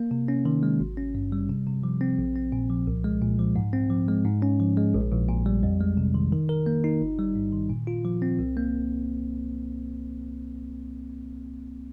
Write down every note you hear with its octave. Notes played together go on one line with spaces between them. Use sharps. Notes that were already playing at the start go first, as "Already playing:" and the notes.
Already playing: A#3
C3
C#4
D#3
G#3
G#1
C#4
G2
G3
C3
C3
F3
C4
A#1
C4
A#2
F3
C2
G#3
A#2
F3
G#2
C4
F3
G#3
G#2
C#4
F3
G#3
A#1
A#1
A#2
G3
F2
G#3
C3
D#3
D#3
A#4
A#3
D#4
G1
G3
G2
D#3
A#2
F4
F3
C4
C2
A#3